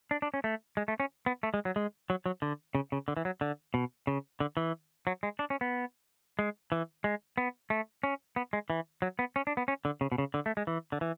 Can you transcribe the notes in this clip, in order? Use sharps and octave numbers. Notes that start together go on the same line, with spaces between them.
D4
D4
C#4
A3
G#3
A3
C#4
B3
A3
G#3
F#3
G#3
F#3
F#3
D3
C#3
C#3
D3
E3
F#3
D3
B2
C#3
D3
E3
F#3
G#3
D4
C#4
B3
G#3
E3
G#3
B3
A3
C#4
B3
G#3
E3
F#3
B3
C#4
D4
B3
C#4
D3
C#3
B2
C#3
D3
A3
G#3
E3
D3
E3